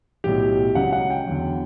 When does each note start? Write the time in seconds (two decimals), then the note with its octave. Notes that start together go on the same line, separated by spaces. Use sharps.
0.24 B1 A2 F#3 G4
0.75 C#2 C#3 F#3 F#5
0.93 F#5
1.10 G5
1.27 E2 D3 F#3